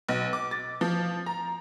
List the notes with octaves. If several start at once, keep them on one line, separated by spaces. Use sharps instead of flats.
B1
D6
A6
F3
A#5